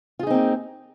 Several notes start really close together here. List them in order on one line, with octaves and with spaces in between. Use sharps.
F4 G#4 D#4 C4 A#3